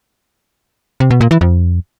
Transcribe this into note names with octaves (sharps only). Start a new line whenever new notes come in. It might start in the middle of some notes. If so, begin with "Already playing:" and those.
C3
B2
A#2
E3
F2